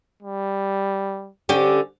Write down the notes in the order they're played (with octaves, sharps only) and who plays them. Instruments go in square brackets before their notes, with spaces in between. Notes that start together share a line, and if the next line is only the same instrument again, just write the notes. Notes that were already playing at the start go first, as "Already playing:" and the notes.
[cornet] G3
[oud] D3 C#4 G4